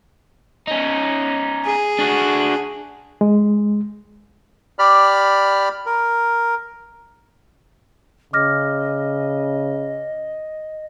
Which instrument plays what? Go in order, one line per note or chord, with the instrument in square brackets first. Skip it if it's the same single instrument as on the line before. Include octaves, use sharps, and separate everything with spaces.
[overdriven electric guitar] C#4 D#4
[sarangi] G#4
[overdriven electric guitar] D4 F#4
[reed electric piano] G#3
[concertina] G4 D5 B5 F6
A#4
[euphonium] C#3 [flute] D#5 [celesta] D6 F6 A#6